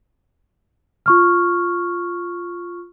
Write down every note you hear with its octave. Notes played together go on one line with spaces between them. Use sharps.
F4 C#6 F6